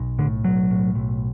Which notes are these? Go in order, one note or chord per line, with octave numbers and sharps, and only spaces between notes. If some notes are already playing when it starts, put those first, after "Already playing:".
Already playing: B1
A2 D3
B1 F#3
A2
B1